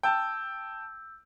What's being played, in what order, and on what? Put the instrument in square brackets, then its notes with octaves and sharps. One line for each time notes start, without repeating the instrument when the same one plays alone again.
[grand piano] G5 A5 [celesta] E6 G6